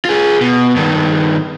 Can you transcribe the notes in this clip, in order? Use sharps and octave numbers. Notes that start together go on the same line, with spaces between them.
F4 G#4
B2
G2 D#3